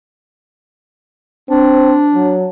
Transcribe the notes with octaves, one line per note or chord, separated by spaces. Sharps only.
C4 D4
F#3